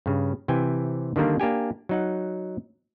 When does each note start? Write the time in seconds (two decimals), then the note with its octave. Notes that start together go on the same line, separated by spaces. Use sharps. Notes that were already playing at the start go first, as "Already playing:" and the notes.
0.06 G2 C#3
0.48 C3 E3 G5 G#5
1.16 D3 D#3 G3 A#3 D4
1.40 A#3 D4 G4 G#5
1.89 F#3 D#4 F#5